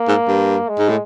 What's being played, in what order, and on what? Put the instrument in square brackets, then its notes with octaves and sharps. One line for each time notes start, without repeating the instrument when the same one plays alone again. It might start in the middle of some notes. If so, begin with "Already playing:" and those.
Already playing: [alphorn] A#3
[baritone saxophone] G#2
G2
[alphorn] G#3
[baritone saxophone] G#2
A2